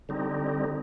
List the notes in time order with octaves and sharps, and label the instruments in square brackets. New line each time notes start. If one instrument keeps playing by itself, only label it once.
[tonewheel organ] D3 G3 C4 D#4